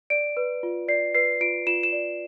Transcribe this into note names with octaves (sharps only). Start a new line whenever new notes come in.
D5 D7
B4
F4
D5 C7
B4 C7
F4 D7
F4 E7
E7
D5